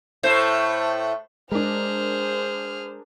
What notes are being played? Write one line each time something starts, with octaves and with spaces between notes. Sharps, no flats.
A2 A3 C5
G#3 D4 G#4 A#4 C5 F6